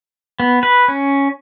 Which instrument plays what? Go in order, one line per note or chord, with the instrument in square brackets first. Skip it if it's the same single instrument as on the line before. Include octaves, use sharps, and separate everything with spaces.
[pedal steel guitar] B3
B4
C#4